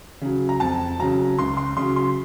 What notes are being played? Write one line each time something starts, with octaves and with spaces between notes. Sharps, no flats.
C#3 F#3
A#5
F2 A5
C#3 F#3 A#5
C#2 C6
C6
C#3 F#3 C6
C6